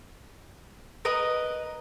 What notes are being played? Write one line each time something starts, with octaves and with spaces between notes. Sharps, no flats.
A#4 B4 D#5